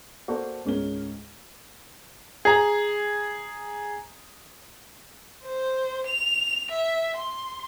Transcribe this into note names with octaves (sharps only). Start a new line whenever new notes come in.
A#3 F#4 A4 C5 D5 A5
C#2 G#2 C#4 G#4 A#4 G7
G#4 A#5
C5
F7
E5
C6